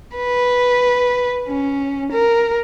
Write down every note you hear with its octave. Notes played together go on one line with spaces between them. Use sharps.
B4
C#4
A#4